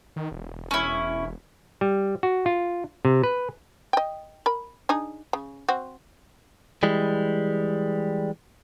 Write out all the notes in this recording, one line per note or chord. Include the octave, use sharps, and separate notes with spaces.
D#3
E1
C#4 E4
G3
F#4
F4
C3
B4
D#5 G5
A#4 B5
D4 D#4 G#4
C#3
C4 F#4
E3 G3 G#3